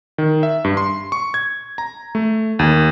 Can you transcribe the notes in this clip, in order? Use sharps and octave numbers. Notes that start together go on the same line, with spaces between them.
D#3
E5
G2
C6
C#6
G#6
A#5
A3
D#2